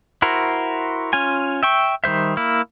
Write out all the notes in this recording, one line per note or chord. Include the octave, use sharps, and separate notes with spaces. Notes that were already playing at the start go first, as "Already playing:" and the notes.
E4 F#4 A#4 C5
C#4 F4 G#5
E5 G5 C#6
D#3 G3 C5 E5
A#3 E4